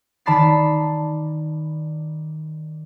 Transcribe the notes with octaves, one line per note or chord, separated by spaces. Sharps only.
D#3 D5 A5 B5 A6 C7